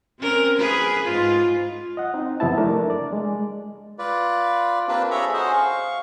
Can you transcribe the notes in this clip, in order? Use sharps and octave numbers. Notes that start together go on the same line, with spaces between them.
C4 C#4 A#4
G#4 B4
G#2 F4
D#5 F#5
C4 D#4
F2 C3 B3 E4 A5
A3 D4 A#4
D5
G#3
F4 B4 D5
A#3 C4 D4 F4 G4 B4
G#4 A4 C#5 E5 A#5 B5
C#4 F#4 G#4 C5 D#5
F5 C#6